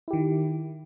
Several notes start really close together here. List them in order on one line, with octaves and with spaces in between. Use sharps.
E4 G4 D#3